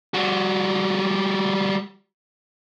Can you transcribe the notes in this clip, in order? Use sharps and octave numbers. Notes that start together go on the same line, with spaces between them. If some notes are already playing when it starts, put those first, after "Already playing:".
G3 F#4